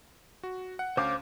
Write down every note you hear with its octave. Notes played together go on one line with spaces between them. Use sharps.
F#4
F#5
D2 C#4 C5 F5 D6 G6